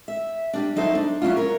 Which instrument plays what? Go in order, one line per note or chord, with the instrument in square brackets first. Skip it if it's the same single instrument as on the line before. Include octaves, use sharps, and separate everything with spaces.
[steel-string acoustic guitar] E5
G3 D4
F#3 D#4 A4 C5 E5
D4
F#3 C#4 E4 F4
A#4 C#5